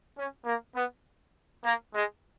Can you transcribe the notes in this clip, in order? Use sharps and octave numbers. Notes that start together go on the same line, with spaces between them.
C#4
A#3
B3
A#3
G#3